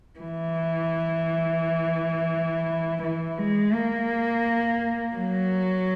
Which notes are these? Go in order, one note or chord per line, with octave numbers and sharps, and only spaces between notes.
E3
E3
G#3
A#3
F#3